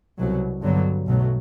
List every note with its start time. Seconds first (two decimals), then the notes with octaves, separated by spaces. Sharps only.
0.17 C2 B2 F#3
0.62 G2 D3 F#3 B3
1.06 B1 B2 F#3 A3